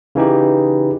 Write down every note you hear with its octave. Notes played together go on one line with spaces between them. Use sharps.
C#3 E3 D#4 G4